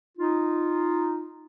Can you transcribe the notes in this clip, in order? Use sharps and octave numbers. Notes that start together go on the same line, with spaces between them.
D#4 F4